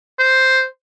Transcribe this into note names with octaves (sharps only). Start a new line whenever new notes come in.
C5